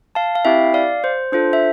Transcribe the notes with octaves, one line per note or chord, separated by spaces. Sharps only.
F5 A5
F5
C4 E4 G4 E5 G5
D5 F5
C5
D4 F4 A4 C5
E5